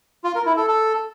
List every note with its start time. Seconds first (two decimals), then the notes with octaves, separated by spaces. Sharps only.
0.24 F4
0.35 A#4
0.46 E4
0.57 A4
0.68 A4